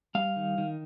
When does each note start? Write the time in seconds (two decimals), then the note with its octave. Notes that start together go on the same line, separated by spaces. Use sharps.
0.15 G3 F5
0.36 D#3
0.58 D#3